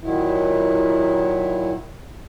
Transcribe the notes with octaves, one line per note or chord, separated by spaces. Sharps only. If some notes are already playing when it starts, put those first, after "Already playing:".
A#2 D#3 F#3 E4